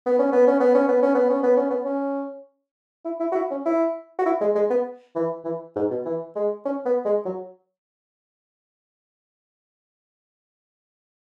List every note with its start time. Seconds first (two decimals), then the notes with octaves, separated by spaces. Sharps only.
0.06 B3
0.19 C#4
0.32 B3
0.47 C#4
0.60 B3
0.75 C#4
0.89 B3
1.02 C#4
1.15 B3
1.29 C#4
1.43 B3
1.57 C#4
1.70 B3
1.85 C#4
3.05 E4
3.20 E4
3.32 F#4
3.35 E4
3.51 C#4
3.66 E4
4.19 F#4
4.26 E4
4.41 G#3
4.55 G#3
4.70 B3
5.15 E3
5.45 E3
5.76 G#2
5.90 B2
6.05 E3
6.36 G#3
6.65 C#4
6.86 B3
7.05 G#3
7.26 F#3